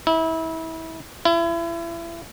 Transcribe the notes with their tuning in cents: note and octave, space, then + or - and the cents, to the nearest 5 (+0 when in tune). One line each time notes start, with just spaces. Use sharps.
E4 -25
E4 +35